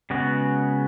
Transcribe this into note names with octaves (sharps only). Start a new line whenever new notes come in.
C#3 G#3 B3 F#4